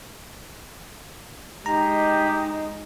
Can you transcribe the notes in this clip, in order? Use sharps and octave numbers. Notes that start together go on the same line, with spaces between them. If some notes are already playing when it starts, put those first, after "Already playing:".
G#3 D#4 G4 A#5